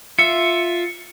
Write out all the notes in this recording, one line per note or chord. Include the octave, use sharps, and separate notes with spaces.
F4 E5 C#7